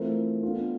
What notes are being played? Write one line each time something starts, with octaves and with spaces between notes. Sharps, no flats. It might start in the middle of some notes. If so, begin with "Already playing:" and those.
Already playing: E3 A3 C4 F4 A#4
B3 D4 F4 A4